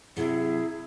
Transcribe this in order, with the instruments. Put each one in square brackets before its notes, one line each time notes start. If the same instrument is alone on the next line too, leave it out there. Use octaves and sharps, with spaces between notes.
[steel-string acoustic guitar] C3 F#3 [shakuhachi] E4 [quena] G#4